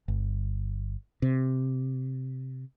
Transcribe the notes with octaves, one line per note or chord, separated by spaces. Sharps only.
G1
C3